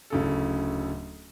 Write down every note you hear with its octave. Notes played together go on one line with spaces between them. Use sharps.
D1 C#3 A4